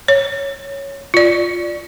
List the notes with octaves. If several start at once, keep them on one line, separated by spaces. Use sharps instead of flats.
C#5
F4 D5